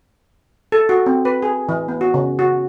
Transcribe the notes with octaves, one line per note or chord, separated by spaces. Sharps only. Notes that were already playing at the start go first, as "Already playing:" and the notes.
A4
F#4
C4
B4
G#4
E3
B3
F#4
C#3
F#4